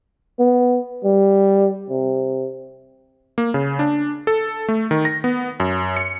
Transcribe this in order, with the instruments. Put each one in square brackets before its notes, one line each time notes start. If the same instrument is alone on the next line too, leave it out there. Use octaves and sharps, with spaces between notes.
[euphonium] B3
G3
C3
[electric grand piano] A#3
C#3
D4
A4
A3
D#3
A#6
B3
F#2
C#7